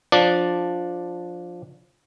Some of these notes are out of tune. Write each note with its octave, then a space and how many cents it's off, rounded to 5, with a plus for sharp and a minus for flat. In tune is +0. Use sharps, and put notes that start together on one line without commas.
F3 +10 D4 +0 D5 +0